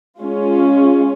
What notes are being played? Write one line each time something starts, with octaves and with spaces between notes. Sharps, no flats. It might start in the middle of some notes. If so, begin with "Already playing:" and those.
G#3 C#4 F4